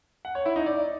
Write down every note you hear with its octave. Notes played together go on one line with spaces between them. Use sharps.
F#5
C#5
E4
D#4
D5